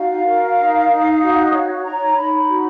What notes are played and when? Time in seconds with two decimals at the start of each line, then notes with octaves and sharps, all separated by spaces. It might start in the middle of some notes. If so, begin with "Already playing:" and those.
Already playing: D#4 F#4 F5
0.24 A#4
0.57 D#4
0.88 D#4
1.20 F#4
1.52 C#5
1.84 D#4 A#5
2.16 D#4 B5
2.48 F#4